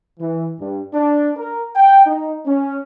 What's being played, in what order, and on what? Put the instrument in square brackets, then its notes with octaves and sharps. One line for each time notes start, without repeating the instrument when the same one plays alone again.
[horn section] E3
G2
D4
A#4
G5
D#4
C#4